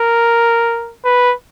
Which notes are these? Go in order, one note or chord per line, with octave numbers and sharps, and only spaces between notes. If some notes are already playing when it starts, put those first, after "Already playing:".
Already playing: A#4
B4